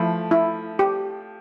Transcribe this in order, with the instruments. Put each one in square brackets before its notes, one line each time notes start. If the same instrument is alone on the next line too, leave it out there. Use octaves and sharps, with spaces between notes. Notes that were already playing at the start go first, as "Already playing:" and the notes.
Already playing: [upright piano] F3 A3 [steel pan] E4
[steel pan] E4
G4